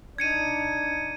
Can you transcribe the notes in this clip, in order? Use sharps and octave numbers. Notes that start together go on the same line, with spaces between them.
D4 D#4 G#6 C#7 D#7